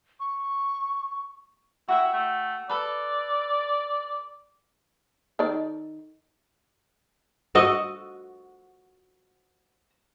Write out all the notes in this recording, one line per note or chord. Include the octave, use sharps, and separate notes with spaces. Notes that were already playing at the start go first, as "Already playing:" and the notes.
C#6
E4 F#4 F#5 G5
A3
A4 B4 D5
D#3 A4 D5
F#4 D#5